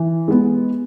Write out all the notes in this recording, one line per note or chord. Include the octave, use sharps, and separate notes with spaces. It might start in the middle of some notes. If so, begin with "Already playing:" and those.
Already playing: E3
G#3 B3